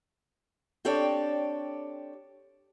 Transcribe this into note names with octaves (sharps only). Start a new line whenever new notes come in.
C4 D4 G4 A4 C#5 D5